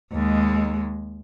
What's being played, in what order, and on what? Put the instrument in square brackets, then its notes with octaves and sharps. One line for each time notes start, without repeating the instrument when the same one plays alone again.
[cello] D#2 G#3